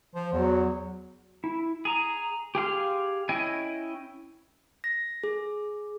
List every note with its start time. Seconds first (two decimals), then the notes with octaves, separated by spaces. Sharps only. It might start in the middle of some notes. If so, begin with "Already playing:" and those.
0.15 F3
0.33 E2 F#3
1.44 E4
1.85 G#4 A#5
2.55 G4 G#4 F5 C6
3.29 C#4 E4 D#5 G5 G#5
4.84 A#6
5.24 G#4